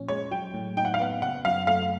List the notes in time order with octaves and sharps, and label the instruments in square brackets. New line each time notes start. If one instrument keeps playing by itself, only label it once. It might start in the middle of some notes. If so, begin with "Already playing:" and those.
Already playing: [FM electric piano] A#2 F3 C#4
[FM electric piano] G#3 [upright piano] C#5
[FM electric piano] F#3 [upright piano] G5
[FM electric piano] A2
[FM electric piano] D#4 [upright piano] G5
[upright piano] F#5
F5
[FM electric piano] B3 [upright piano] F#5
[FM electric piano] C#3 [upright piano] F#5
[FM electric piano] F#2 [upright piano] F5
[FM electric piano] A3 [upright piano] F5